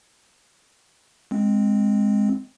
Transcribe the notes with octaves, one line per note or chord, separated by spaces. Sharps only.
G#3 C4